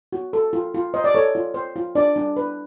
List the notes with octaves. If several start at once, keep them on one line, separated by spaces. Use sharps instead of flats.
F#4
A4
F4
F4
C5 D#5
D5
A4 C#5
F4
C5
F4
D4 D5
D4
B4